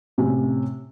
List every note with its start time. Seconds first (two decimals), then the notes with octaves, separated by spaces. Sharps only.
0.18 A2 C3 C#4